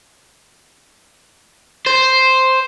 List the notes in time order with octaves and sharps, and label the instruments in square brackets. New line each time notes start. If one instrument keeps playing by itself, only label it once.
[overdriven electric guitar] C5